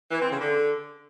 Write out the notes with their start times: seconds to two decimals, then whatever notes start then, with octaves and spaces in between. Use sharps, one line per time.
0.11 E3
0.21 C4
0.30 C#3
0.40 D3